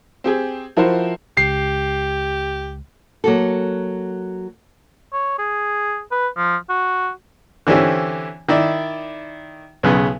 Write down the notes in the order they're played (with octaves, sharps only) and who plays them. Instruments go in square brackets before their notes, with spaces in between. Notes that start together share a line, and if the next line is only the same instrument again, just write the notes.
[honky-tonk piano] C4 G4 G#4
F3 E4 F#4 A#4 C5
[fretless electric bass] C#2 [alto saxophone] G4 [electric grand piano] C7
[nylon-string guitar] F#3 A#3 F#4 A4
[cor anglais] C#5
G#4
B4
F3
F#4
[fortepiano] D3 E3 C4 C#4 G4
D#3 E4 D5
B1 C#3 B3